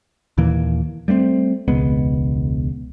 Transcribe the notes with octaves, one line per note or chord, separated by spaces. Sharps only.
D#2 A#2 E3 A#3
G3 A3 A#3 C4
E1 C#2 G#3 B3